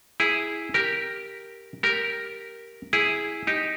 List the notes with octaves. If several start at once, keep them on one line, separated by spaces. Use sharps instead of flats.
E4 G#4
G4 A#4
G4 A#4
E4 G#4
D#4 G4